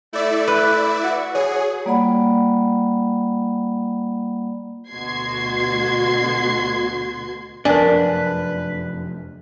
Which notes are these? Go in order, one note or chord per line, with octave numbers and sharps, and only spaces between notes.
A3 E4 D5 E5
B4
F#4
G#4 C#5
G3 A#3 F4 D5 F#5 B5
D2 B2 F#4 C6 G#6 C7
F1 F#2 D4 A#4 B4 G#5